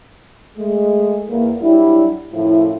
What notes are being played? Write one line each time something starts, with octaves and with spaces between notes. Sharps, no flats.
G#3 A3
E2 A#3
F#3 G3 D4 E4
F#2 A2 F3 E4